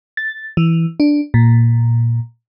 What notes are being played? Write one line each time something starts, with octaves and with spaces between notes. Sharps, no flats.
A6
E3
D4
A#2